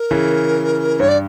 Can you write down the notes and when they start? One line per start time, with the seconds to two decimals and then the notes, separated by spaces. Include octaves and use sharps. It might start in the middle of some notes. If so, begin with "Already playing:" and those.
Already playing: A#4
0.11 C#3 E3
0.99 G2 C#5
1.08 D5